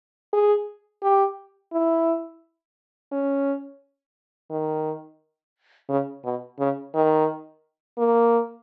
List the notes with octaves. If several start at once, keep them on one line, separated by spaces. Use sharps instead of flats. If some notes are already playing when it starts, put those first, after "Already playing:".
G#4
G4
E4
C#4
D#3
C#3
B2
C#3
D#3
A#3